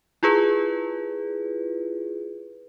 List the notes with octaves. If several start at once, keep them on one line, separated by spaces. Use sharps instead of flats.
E4 F4 G#4 B4